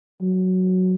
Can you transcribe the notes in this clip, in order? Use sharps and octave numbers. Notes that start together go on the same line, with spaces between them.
F#3